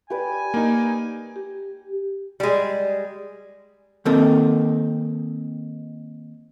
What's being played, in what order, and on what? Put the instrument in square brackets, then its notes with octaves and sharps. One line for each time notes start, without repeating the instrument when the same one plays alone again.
[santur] G4 B4 D5 [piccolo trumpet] G#5
[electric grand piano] A#3 D#4
[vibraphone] G4
[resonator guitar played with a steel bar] G3 G#3
[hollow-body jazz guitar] D#3 A#3 C4 D#4 A4 A#4